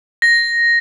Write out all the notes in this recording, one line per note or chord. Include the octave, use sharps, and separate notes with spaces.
A#6